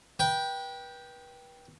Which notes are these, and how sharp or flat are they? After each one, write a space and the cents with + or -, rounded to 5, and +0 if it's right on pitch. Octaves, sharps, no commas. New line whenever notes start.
B4 -30 G5 +0